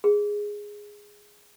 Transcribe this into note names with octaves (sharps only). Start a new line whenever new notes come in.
G#4